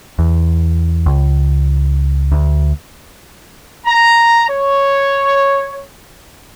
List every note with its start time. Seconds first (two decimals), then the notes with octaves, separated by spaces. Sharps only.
0.19 E2
1.06 C#2
2.32 D2
3.86 A#5
4.49 C#5